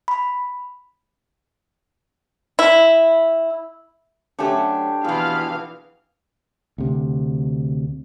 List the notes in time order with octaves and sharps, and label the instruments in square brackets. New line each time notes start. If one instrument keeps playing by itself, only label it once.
[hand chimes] B5
[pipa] E4
[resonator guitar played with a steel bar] F#3 A3 C#4 [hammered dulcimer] D4 G4 C5
[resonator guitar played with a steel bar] F2 B2 [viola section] E3 F5 [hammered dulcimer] G#4
[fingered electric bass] D2 C3